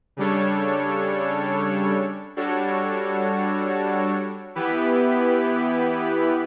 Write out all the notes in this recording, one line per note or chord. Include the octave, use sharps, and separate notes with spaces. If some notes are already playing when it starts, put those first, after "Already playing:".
C#3 G3 D4 A4 C#5
G3 D4 F#4 A4 C#5
E3 B3 E4 G4 B4